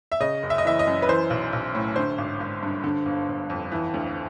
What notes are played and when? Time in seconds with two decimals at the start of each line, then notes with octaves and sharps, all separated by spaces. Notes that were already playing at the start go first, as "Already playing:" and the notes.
0.12 E5
0.20 C#3 D#5
0.43 F#1
0.50 E5
0.58 D#5
0.65 E3 E5
0.79 D#5
0.87 F#2
1.02 B4
1.08 E3 C5
1.30 B1
1.53 B1
1.75 A2
1.96 D3 C5
2.18 G#1
2.40 G#1
2.63 G2
2.84 D3
3.06 G1
3.28 G1
3.50 F2
3.72 E3
3.94 D2